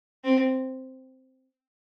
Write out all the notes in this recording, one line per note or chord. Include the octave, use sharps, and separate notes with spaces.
C4